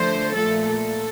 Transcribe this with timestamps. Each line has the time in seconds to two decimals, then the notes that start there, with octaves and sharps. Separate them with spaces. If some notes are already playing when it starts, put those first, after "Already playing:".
Already playing: D3 F3 A3 C5
0.36 A#2 A3 A4
0.66 A4